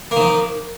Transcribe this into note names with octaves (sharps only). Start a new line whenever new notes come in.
D#3 F3 A#3